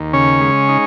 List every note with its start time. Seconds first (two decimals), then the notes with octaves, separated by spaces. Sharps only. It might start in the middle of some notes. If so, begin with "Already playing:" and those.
Already playing: D#2
0.13 C#3 C#4 C#5
0.41 G#3
0.69 D#4